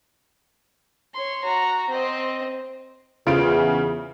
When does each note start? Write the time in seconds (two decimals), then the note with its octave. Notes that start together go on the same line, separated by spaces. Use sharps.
1.14 C#5 C6
1.44 F#4 A#5
1.89 C4 D#5
3.27 E2 C#3 F4 C5 F5 D7